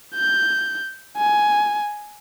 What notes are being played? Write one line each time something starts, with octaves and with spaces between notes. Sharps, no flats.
G6
G#5